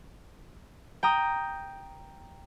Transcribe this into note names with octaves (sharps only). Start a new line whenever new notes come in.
G5 A#5 D#6